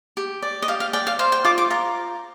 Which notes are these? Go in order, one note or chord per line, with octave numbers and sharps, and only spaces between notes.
G4
D5
D#5
G4 F5
F5
D5 G5
F5
C5 F5
G5
F4 D6
D6
F4 A#5